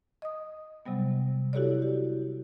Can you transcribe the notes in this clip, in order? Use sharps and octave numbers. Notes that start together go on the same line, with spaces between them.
D#5 D#6
C3 F#3 G3 B3
E4 F#4 G4 A4 C#5 D5
G4